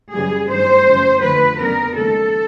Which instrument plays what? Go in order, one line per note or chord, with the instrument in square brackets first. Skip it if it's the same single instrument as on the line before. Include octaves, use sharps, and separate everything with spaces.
[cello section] F#2 C#3 E3 G3 G#4
G2 D#3 G3 C5
F#2 C#3 E3 A3 C#4
F2 D3 F3 A3 B4
F2 C#3 F#3 B3 D4 A#4
D#2 C#3 F3 G#3 A4